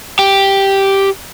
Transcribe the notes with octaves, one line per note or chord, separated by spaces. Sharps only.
G4